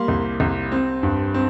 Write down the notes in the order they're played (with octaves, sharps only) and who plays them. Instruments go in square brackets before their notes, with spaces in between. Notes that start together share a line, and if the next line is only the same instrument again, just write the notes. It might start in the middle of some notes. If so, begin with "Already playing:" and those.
Already playing: [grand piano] G3 A#3 C6
C2
C2
C4
G2
C4